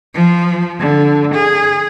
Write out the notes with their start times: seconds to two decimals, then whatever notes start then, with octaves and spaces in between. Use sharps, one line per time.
0.15 F3
0.80 D3
1.35 G#4